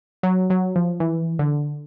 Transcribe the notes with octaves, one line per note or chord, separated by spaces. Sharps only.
F#3
F#3
F3
E3
D3